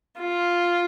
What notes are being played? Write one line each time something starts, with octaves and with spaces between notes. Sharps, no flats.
F4